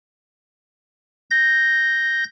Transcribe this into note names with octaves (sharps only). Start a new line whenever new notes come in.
G6 A#6